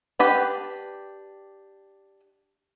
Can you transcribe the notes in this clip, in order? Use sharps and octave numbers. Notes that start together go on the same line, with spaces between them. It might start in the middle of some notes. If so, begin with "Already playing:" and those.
D4 G4 B4 G5